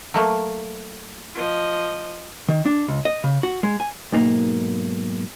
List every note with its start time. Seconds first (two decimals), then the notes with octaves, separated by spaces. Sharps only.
0.14 F#3 A3 A#3
1.35 F3 D#5
2.49 D#3
2.66 D4
2.88 C#2
3.05 D#5
3.24 C#3
3.43 F#4
3.63 G#3
3.80 G#5
4.12 B1 G#2 A#3